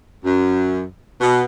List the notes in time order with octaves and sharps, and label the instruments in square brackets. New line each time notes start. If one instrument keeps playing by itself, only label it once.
[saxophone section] F#2
B2